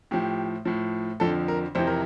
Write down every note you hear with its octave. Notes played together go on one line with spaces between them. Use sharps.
A2 F3 G4
A2 F3
F2 D3 F3 A4
A#4
F2 C3 E3 C5
A#4